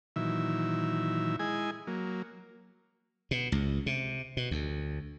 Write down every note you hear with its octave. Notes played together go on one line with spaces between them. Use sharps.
A#2 D#3 E3 F#3 E5
G#3 E4 G#4 D#5 G#5
F#3 A#3
B2
C#2
C3
B2
D2